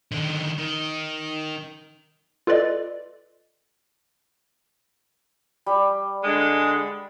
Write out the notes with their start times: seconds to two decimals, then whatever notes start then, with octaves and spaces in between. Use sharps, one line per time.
0.12 D3 D#3
0.58 D#3
2.47 F4 A4 B4 D5 D#5
5.66 G3
6.23 D3 G#3